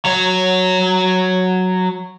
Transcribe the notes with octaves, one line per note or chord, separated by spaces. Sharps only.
F#3 C#5